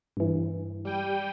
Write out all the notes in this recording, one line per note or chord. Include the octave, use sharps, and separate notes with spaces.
G2 E3
G3 G5 D#7